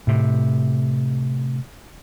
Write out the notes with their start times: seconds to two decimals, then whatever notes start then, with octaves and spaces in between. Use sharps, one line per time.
0.07 A2 C3